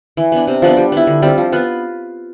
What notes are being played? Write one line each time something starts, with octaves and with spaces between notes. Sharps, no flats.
E3
B3 D4
C3
F3 B3 D4
G3
B3 E4
D3
G3 C4 F4
F3
B3 F4 B4